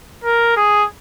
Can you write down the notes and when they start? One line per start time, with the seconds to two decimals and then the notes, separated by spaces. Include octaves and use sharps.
0.24 A#4
0.56 G#4